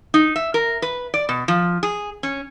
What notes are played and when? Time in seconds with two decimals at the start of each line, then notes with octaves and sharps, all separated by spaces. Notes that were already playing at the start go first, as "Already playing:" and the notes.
0.14 D#4
0.36 E5
0.54 A#4
0.82 B4
1.14 D5
1.29 B2
1.48 F3
1.83 G#4
2.23 C#4